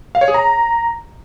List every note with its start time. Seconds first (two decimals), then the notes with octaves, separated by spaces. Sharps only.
0.15 F5
0.21 C#5
0.28 G#4
0.34 A#5